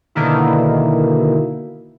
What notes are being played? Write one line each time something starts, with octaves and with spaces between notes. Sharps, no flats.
B2 D3 D#3 A#3 E4